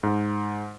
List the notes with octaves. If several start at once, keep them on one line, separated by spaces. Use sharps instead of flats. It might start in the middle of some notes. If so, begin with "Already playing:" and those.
G#2